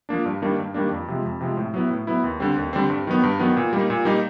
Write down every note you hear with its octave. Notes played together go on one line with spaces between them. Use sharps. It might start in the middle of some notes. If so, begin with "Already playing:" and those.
F3 A#3 D4
G2
D#3 G3 A#3 D4
G2
D#3 G3 A#3 D4
F2
C3 F3 G#3
F2
C3 F3 G#3
A2
F#3 B3 E4
A2
F#3 B3 E4
D#2
D3 G3 C4
D#2
D3 G3 C4
G2
D#3 F#3 B3
G2
D#3 F#3 B3
A#2
G3 A#3 D#4
A#2
G3 A#3 D#4